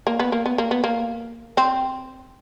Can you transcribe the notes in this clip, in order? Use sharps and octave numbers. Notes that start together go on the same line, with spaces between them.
A#3
B3
A#3
B3
A#3
B3
A#3
C4